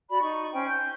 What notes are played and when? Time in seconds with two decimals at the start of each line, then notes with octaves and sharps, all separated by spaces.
0.09 F#4 D5 B5
0.21 D#4 C#6
0.52 C#4 C5 G5
0.69 G6